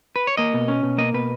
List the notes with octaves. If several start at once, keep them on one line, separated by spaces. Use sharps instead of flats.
B4
C#5
A#3 D#5
B2
C#4
B2
A#3 D#5
B2 B4